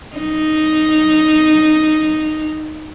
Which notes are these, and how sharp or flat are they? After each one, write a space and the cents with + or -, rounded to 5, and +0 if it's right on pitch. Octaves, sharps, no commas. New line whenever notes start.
D#4 -5